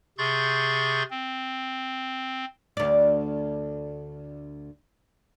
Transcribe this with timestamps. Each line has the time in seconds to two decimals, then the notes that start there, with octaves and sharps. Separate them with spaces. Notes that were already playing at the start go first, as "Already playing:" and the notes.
0.18 C3 G#4 C6 C#6 G6 A6
1.10 C4
2.77 D2 D5